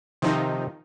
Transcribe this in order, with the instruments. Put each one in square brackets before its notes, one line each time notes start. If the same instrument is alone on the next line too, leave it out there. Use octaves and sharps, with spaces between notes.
[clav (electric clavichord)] C3 C5 D#5 [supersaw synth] D#3 F3 D#4